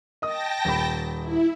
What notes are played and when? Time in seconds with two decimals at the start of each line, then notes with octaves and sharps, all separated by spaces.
0.22 D#5 G5 A5 D#6 A#6
0.65 D#1 B5
1.20 E4